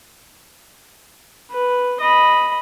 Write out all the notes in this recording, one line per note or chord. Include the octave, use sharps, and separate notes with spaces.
B4
D#5 B5